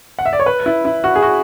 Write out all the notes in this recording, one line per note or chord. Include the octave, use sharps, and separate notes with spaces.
F#5
E5
D5
C#5
B4
E4
E4
F#4
G#4
F#4